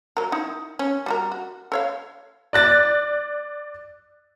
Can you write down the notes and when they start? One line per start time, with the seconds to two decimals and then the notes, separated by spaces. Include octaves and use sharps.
0.17 F#3 A#4
0.32 D#4 E4
0.79 C#4
1.06 G3 F#4 A#4
1.32 F#4
1.72 A4 C#5 F5
2.53 D5 F#6 A6